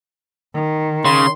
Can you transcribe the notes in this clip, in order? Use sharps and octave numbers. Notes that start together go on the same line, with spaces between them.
D#3
C#3 C6